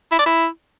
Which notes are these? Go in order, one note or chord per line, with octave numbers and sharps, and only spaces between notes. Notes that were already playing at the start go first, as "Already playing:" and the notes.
E4
D5
E4